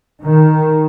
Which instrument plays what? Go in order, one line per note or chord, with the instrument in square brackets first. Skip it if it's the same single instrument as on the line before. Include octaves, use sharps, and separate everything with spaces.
[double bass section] D#3